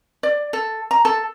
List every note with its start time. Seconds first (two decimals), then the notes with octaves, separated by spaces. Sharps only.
0.23 D5
0.53 A4
0.91 A#5
1.05 A4